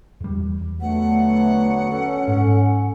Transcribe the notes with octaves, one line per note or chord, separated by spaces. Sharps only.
E2 G3
D3 F#3 A3 B3 F#5
C#4 A4
G#2